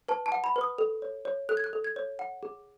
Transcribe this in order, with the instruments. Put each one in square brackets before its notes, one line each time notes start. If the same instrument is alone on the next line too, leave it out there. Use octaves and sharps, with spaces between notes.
[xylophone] B4 A5
A5
F#5
B5
B4
D#6
A4
C#5
C#5
A4 F#6
G#6
F#6
A4
G#6
C#5
F#5
G#4